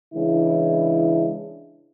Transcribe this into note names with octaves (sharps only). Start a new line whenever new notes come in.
C#3 E3 G#3 D4 E4